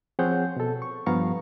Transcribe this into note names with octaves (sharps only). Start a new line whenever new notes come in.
F3 C4 G#4 C#5 F#5 G6
B2 A4
C#6
G2 F3 B3 F5 A#5 C#6